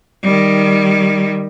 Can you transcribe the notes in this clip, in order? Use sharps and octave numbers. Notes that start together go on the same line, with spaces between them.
D#3 G3